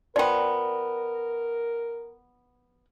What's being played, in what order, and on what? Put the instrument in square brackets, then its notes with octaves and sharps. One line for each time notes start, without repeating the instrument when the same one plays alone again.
[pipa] F3 B3 [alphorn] A#4 [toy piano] D5 G5